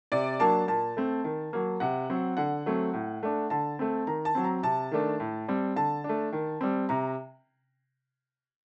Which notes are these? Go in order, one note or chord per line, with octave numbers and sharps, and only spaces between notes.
C3 D5
F#3 A#3 D4 A5
A#2 A5
A3 C4
D#3
F#3 A#3
C3 F#5
F#3 C4
D3 F#5
F#3 A3 C4
A2
A3 D4
D3 A5
A3 C4
D#3 A#5
A5
F#3 C4
A#5
C3 A5
D#3 A3 D4
A2
G3 C4
D3 A5
A3 D4
D#3
G3 C4
C3 A#5